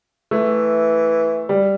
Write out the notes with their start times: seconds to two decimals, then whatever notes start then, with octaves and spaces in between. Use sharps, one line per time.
0.31 E3 A3
1.49 G3